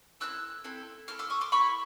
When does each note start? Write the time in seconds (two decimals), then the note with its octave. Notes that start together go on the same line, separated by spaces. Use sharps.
0.20 C4 E4 A4 E6 F#6
0.64 C4 E4 A4
1.08 C4 E4 A4 F6
1.19 D6 E6
1.30 C#6 D#6
1.41 C6 D6
1.52 C4 E4 A4 B5 C#6